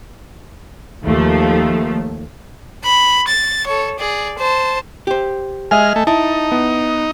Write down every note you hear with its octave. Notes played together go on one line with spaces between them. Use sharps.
D#2 F3 A3
B5
A6
A4 C#5
G#4 D5
C5 A5
G4 C5
G#3 D#5 E5 G#5 F6
A3
D#4 E4 A5
B3